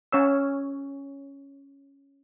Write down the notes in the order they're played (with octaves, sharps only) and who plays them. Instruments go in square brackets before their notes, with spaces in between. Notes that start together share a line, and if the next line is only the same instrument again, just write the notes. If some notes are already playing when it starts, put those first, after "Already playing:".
[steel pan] C#4 C#5 E6